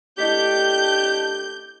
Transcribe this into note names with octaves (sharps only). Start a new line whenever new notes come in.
A3 D4 E4 G4 D#5 G6 B6